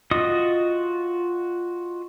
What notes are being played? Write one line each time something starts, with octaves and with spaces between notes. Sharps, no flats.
F4 F#4 D#5 D#6